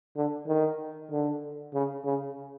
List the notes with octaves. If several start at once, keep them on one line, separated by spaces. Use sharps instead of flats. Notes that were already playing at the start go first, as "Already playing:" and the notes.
D3
D#3
D3
C#3
C#3